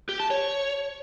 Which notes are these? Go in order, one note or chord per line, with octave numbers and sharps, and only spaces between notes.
G4
A5
C#5